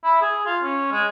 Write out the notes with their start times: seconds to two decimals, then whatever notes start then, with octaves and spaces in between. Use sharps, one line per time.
0.04 E4
0.21 G#4
0.46 F4
0.63 C#4
0.92 G#3